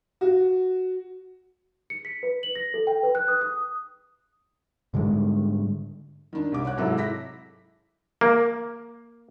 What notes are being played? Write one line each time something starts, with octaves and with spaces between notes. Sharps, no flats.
F#4
C#7
B6
B4
F#7
A#6
A4
G5
B4
F#6
D#6
D#6
G#2 D3 G3 G#3
D#3 D4
C2 D6
C#5 F#5 F#6
G#2 C3 F#3 G#3 E4 A4
E4 A#6 B6
A#3